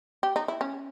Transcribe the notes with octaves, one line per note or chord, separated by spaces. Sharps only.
G4
D#4
E4
C#4